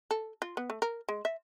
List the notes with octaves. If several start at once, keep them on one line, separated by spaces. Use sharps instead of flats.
A4
F4
B3
A3
A#4
G#3
E5